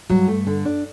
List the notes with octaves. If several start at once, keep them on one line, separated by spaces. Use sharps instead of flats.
G2 F#3
A3
D3
D4